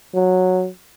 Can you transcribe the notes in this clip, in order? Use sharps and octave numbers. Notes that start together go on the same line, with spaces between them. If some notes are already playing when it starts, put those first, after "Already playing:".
F#3